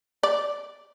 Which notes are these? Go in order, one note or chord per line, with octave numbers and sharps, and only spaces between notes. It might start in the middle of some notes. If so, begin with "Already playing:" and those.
D5